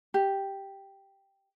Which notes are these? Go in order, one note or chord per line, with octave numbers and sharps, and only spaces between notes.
G4